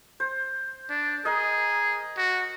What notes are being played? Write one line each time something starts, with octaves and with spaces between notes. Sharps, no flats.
C5
D4
G#4 A#4 D#5
F#4